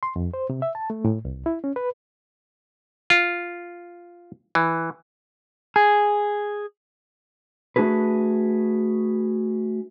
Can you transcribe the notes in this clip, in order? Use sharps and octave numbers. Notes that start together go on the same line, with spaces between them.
C6
F2
C5
C3
E5
A5
A3
A2
C2
E4
C#4
B4
F4
E3
G#4
A3 D4 F#4 G#4 B4